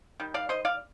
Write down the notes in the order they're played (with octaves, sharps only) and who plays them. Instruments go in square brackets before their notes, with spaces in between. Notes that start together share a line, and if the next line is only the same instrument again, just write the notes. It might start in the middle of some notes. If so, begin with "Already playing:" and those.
[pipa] D#3 G3
D5 F5
C5 D#5
D5 F5